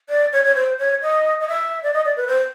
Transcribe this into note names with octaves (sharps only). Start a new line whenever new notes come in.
D5
C#5
C#5
C5
C#5
D#5
D#5
E5
D5
D#5
D5
B4
C5